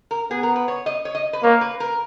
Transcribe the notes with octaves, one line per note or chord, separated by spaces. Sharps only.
A#4
B3 G#4
A#4
B4
C#5
D#5
C#5
D#5
B4
A#3 C#5
B4
A#4